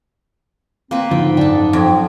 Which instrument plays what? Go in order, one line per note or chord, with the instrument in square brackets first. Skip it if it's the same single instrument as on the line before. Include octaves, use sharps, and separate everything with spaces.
[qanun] A#3 B4 [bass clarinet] C4
[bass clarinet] G#2 [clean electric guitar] D3 F3 [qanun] G5
[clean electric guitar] F#2 G5 [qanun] D4 A4
[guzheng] F2